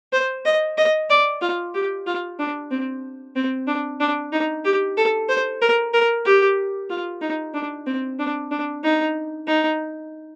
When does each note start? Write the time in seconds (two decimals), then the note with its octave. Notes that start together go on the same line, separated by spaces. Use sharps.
0.13 C5
0.45 D#5
0.78 D#5
1.10 D5
1.42 F4
1.74 G4
2.07 F4
2.39 D4
2.71 C4
3.36 C4
3.67 D4
4.00 D4
4.32 D#4
4.65 G4
4.97 A4
5.29 C5
5.61 A#4
5.93 A#4
6.25 G4
6.90 F4
7.22 D#4
7.54 D4
7.86 C4
8.19 D4
8.51 D4
8.84 D#4
9.47 D#4